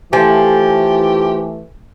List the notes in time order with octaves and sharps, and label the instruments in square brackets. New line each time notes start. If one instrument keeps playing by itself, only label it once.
[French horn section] E3 A3 [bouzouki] F3 [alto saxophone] G4 [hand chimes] G#5